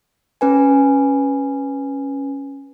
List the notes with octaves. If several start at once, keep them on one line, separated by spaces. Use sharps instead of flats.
C#4 B4 G#5